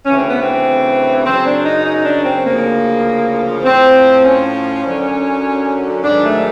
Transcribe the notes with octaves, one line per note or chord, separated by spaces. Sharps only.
D2 C#3 E3 C#4
C4
B3
C4
F#2 C#3 F#3 C4
D4
D#4
D#4
D4
C4
D2 C#3 F3 A#3
A2 F3 C4
C#4
F#2 D3 F#3
G#2 D#3 F#3 D4
A3